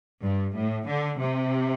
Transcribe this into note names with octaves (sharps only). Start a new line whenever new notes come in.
G2
A2
D3
C3